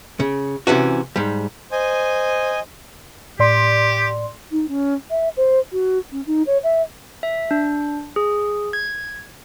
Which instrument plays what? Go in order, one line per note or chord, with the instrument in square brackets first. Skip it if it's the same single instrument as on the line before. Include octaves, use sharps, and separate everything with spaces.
[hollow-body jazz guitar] C#3
C3 E3 C#4 F#4
G#2 G3
[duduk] C5 [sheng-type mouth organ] D#5 G#5
[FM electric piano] A2 D5 C6 [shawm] G4
[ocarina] D#4
C#4
E5
C5
F#4
C#4
D#4
C#5
E5
[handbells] E5
D4
G#4
G#6